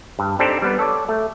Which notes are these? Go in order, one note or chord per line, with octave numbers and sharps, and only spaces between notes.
G2
C4 D4 D#4 G4 A4 C5
G3 B3 B4
A4 C#5 D5
A3